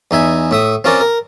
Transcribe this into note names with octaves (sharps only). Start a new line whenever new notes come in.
E2 D#4 E5 G#5
A2 E5 D#6
C4 C#4 F4 A#4 D5
A#4